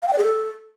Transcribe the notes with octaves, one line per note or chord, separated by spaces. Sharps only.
F5
G5
D5
G#4
A4